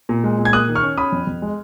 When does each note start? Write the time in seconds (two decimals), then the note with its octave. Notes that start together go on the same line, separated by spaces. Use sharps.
0.09 A#2
0.24 G#3
0.38 A#2
0.45 G#6
0.53 A#3 D#6 F#6
0.68 D#3
0.75 C#6 F6
0.83 C#4
0.98 C#4 B5 D#6
1.12 F2
1.27 F2
1.42 G#3